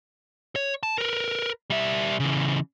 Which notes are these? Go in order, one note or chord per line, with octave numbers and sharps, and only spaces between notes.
C#5
A5
A#4 B4
G3 E5
C#3 E3